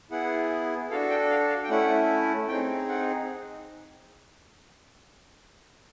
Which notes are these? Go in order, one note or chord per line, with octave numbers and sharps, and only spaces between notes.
B3 E4 G#4 F#5
D4 F#4 A4 F5
G5
F5
F5
G5
A3 C#4 E4 F#5
C4 D#4 G#4 G5
F#5